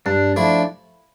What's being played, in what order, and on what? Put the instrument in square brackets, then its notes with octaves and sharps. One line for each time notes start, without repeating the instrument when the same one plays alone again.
[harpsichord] G2 [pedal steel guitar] D4
[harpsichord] F3 A3 E4 [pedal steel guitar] D4